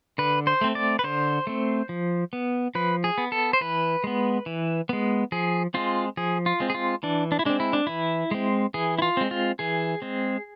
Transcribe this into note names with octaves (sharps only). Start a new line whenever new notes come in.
D3 B4
C5
A3 C4
D5
B4
D3 C5
A3 C4
F3
B3
F3 B4
G#4
B3
A4
C5
E3 B4
G#3 B3
E3
G#3 B3
F3 G#4
G#3 C4 F4
F3 G#4
F4
G#3 C4
G#4
F4
E3 D4
D4
E4
G#3 C4 D4
E4
D4
E3 E4
G#3 C4
E3 G#4
E4
F4
G#3 C4
F4
E3 G#4
G#3 C4